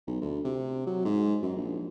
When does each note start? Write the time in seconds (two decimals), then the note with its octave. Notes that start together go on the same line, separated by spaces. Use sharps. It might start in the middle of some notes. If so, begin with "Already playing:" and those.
0.07 B1
0.21 D2
0.45 C3
0.86 F#3
1.05 G#2
1.43 F#2
1.56 A#1